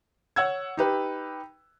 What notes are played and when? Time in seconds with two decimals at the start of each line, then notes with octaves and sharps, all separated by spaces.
0.36 C#5 F#5 E6 G#6
0.77 D#4 G4 B4